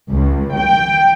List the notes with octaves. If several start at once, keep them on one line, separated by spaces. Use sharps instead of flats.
C#2
G5